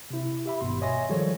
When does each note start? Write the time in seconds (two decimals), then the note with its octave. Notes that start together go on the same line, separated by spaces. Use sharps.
0.10 C3 E4
0.46 G4 E5 B5
0.61 G#1 G2 B2 C6
0.81 C#5 D#5 E5 G#5 C6 A#6
1.09 D#3 F3 G3 G#4 A4 C#5